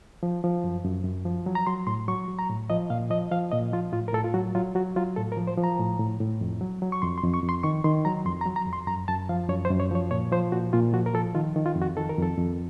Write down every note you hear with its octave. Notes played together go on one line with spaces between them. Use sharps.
F3
F3
F#2
F#2
F#2
F3
F#3
A#5
F#3 C6
A2 C6
F#3 C#6
F#3
A#5
A2
F3 D#5
A#2 F5
F3 D#5
F3 F5
A#2 D#5
F3 F4
A2 F4
A#4
A2 A4
F4
F#3 F#4
F#3 F4
F#3 F#4
F#3 F4
A2 A4
A#4
F3
C5
F3
A#5
A2
A2
A2
F2
F#3
F#3
C#6
F2 C6
C6
F2
C#6
F2
C6
D#3 C#6
D#3 C6
F#3 A#5
F2 C6
A#5
F#3
A#5
F2
C6
F#2 A#5
F#2 A5
F3 F5
F#2 C#5
C5
F#2
C#5
F3 C#5
A#2 C#5
F3 C5
A#2 F#4
A#2 F4
F3 F#4
A#4
F3 A4
D#3 F4
D#3
F4
F2
F#4
D#3 A4
A#4
F2 A4
F2